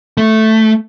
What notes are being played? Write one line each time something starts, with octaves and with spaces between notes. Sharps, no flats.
A3